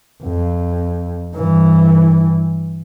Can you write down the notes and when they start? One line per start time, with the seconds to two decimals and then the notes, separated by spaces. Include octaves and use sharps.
0.23 F2
1.35 G2 E3